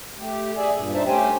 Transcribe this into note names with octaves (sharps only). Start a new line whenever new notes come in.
A3 G4
G#4 D5 E5 G#5
G2 A#2
D4 D#4 C5 E5 A5
A3 C#4 G4 C5 G5 G#5